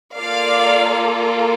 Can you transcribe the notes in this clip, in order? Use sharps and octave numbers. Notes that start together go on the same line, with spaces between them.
A#3 F4 A4 D5 F5